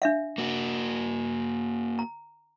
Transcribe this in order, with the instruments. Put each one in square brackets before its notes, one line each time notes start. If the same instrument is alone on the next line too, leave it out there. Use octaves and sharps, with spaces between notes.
[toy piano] D4 E5 F5
[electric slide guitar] A#3 F#4
[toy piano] A#5